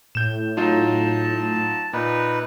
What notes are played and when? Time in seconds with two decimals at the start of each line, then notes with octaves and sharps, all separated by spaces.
0.15 A2 G6 E7
0.57 F#3 D#4 F4 A5
1.93 A#2 D#4 B4